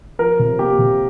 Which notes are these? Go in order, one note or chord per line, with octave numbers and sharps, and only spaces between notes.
F3 A#4
C3
A#3 G4
C3